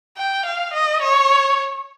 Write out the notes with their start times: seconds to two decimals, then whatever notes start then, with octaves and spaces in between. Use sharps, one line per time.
0.17 G5
0.45 F5
0.73 D#5
1.02 C#5